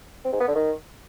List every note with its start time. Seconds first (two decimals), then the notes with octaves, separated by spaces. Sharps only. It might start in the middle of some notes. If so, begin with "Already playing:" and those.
0.25 C4
0.33 G#2
0.40 B3
0.48 D3
0.56 D#3